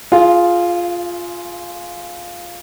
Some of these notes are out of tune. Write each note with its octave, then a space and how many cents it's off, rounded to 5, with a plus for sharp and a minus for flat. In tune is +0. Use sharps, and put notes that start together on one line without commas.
F4 +0 G#4 +20 F5 -35